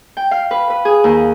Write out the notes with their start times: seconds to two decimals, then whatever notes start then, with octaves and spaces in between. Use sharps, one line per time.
0.17 G5
0.31 F5
0.51 B4
0.70 B4
0.85 G#4
1.04 D#2